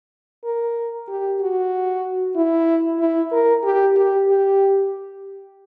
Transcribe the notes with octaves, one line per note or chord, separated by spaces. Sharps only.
A#4
G4
F#4
E4
E4
A#4
G4
G4
G4